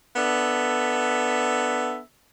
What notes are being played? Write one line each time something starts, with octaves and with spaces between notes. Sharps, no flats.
B3 D4 A4 E5